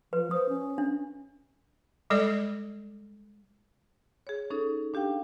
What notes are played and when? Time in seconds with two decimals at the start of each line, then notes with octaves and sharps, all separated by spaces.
0.13 F3 B4
0.31 C5 D#6
0.49 C#4
0.78 D4
2.10 G3 G#3 A4 D5
4.27 G#4 C#5
4.50 C#4 D#4 A4
4.94 D4 G4 F5 G5